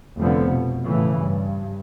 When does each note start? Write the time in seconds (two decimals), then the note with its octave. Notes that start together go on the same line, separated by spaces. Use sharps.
0.19 F1 D3 F3 B3
0.51 B2
0.87 A2 C#3 E3
1.19 G2